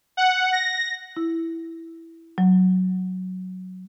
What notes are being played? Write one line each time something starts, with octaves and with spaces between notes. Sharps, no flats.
F#5
A#6
E4
F#3